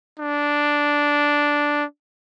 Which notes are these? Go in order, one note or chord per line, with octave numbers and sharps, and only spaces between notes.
D4